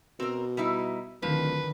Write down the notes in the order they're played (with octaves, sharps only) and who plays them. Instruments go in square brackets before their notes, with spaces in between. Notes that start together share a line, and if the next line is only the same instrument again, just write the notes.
[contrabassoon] B2 [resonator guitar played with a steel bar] C4 A#4
[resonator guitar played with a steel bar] G3 D#4 E4
[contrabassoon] D1 [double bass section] D3 D#3 [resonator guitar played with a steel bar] F3 [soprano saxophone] B4